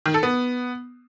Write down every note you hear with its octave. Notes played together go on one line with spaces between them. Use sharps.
D#3
A4
B3